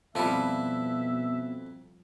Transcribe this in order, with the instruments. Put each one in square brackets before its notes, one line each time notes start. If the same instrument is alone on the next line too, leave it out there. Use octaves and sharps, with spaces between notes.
[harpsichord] F2 E4 [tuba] B2 [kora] F3 G3 [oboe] E5